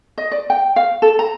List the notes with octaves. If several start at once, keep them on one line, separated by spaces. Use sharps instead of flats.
D#5
D5
G5
F5
A4
A#5